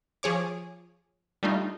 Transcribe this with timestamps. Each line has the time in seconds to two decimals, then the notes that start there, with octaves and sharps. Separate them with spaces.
0.23 F3 G#4 C#5 D6
1.43 G3 A3 D4 D#4 F4